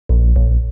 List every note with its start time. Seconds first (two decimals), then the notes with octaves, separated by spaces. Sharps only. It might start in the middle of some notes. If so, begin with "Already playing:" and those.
0.09 A#1
0.36 A#1